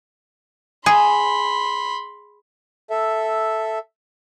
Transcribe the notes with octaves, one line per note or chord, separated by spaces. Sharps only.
G#4 B5 C6
A4 E5